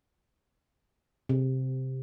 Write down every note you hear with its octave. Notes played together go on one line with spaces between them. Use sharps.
C3